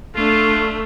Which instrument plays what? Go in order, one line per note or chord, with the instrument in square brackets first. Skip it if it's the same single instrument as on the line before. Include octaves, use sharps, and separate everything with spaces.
[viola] A3 [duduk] D4 [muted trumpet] F4